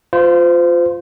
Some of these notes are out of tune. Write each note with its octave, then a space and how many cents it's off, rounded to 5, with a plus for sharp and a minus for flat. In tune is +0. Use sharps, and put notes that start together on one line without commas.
F4 +5 C5 -30